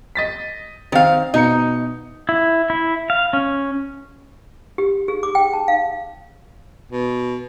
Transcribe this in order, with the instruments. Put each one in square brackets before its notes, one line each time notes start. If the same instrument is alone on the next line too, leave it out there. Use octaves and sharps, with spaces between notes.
[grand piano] D#5 A6 B6
[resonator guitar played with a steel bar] D#3 F5 [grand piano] C4
[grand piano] B2 A#5 C#7 [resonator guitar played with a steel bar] D#4
[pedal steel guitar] E4
E4
F5
C#4
[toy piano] G4
G#4
D6
G5
A5
F5
[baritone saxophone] B2